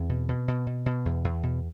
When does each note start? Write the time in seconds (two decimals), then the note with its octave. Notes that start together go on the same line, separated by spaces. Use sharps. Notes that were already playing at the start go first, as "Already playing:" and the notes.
Already playing: E2 C4
0.09 B2
0.28 B2
0.48 B2
0.67 B2
0.86 B2
1.05 E2
1.24 E2
1.43 B2